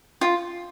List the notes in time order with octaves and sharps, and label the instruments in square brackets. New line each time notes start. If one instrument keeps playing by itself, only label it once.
[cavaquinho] F4